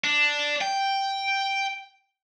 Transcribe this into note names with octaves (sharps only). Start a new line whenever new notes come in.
D4
G5